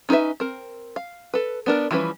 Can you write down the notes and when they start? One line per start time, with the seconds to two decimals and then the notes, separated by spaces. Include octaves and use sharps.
0.09 C#4 D#4 G#4 B4 E5
0.40 C4 A#4
0.96 F5
1.34 A4 B4
1.66 B3 D4 A#4
1.91 E3 F3 G3 C#4 B4